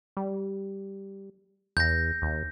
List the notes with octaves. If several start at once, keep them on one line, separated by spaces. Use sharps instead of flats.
G3
E2 G6 A#6
D#2